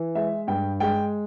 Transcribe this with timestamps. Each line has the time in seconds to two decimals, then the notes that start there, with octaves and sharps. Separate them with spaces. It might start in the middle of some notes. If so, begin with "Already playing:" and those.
Already playing: E3
0.15 G#3 E5
0.47 G2 G5
0.80 G#3 G5